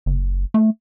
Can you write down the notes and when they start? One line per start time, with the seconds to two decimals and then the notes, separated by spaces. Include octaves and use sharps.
0.06 F#1
0.54 A3